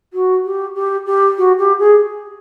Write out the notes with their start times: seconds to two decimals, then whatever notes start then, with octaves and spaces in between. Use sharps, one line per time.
0.13 F#4
0.45 G4
0.75 G4
1.06 G4
1.38 F#4
1.58 G4
1.79 G#4